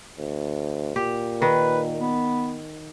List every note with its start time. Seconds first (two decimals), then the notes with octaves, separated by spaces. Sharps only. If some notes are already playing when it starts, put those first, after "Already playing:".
0.19 D2
0.96 A#2 G4
1.42 D#3 B4
1.98 B3